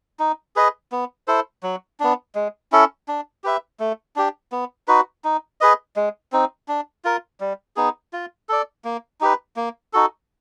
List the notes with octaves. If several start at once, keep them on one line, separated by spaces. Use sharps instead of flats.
D#4
G#4 B4 D#5
B3
E4 A4 C5
F#3
B3 D4
G#3
C#4 E4 A4
D4
G4 B4 E5
A3
D4 G4
B3
D#4 F#4 B4
D#4
G#4 B4 D#5
G#3
C4 D#4
D4
F4 A#4
G3
B3 D#4 G#4
F4
A4 D5
A#3
D#4 G4 B4
A#3
D#4 F#4 A4